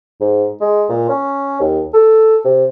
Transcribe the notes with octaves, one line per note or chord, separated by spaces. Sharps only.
G#2
G#3
A#2
C#4
D#2
A4
C3